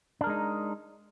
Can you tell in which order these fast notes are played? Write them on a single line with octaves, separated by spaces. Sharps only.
D4 A#4 G#3 D#4